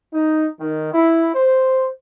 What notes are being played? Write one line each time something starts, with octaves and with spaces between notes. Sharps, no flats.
D#4
D#3
E4
C5